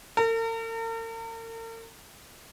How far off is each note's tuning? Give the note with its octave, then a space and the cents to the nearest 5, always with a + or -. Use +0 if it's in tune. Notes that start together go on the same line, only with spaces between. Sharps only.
A#4 -45